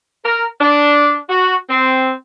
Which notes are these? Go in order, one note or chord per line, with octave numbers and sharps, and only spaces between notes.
A#4
D4
F#4
C4